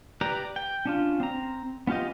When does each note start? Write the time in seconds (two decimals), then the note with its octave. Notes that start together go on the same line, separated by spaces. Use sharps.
0.21 G4 B4 D5 A#5
0.56 G5
0.85 C#4 D4 F4
1.20 C4 A#5
1.87 B3 C#4 F4 G4 D#5